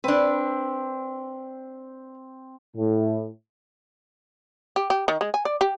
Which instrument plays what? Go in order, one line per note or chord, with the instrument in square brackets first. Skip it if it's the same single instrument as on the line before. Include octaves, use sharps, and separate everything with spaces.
[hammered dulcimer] C4 [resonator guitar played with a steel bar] D4 B4
[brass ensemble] A2
[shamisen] G4
G4
D#3
G#3
G#5
D5
G4